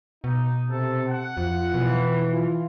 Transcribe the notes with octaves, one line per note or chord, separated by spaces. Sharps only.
B2 D#4
C3 A4
F#5
F2 F4
B2 E3
F4